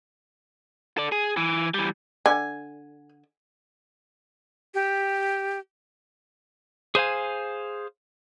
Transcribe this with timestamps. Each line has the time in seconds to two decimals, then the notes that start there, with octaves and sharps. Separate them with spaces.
0.98 A4 D5
1.12 G#4
1.37 E3
1.74 E3 G3
2.26 D3 G#5
4.74 G4
6.95 G#4 C5 F5 G#5